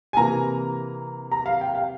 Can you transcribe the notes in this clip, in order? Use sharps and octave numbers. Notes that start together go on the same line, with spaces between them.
G#5
C3 E3 A#3 A#5
A#5
F5
G5
F5